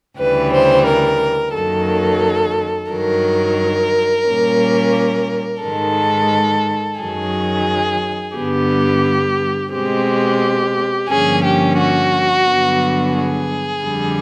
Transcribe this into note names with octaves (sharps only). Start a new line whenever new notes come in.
D2 C#3 E3 G3 B4
C5
A#4
F#2 D#3 F#3 A#3 A4
G2 D#3 F#3 A#4
A#2 G3 A#3 C#4
G#2 D#3 G#3 A4
F#2 D#3 F#3 G#4
G2 D3 G3 B3 G4
B2 G#3 C4 G4
G2 D3 F3 A#3 C#4 G#4
G4
F#4
G2 D3 F#3 B3
G#4
F2 D3 G3